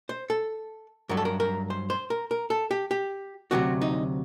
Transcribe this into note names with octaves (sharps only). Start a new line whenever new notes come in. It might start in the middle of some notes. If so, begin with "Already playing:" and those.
C5
A4
G2 F#3 A#4
A4
A#4
A#4
C5
C5
A#4
A#4
A4
G4
G4
D2 C3 D#3 F#3 F#4
D#4